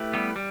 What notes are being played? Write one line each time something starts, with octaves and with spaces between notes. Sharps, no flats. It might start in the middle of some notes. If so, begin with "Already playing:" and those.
Already playing: A3 E4 G4 B4
G3 B3
G3